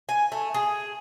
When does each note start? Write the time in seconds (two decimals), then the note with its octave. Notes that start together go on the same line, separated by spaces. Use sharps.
0.09 G#5
0.32 A3
0.54 G#4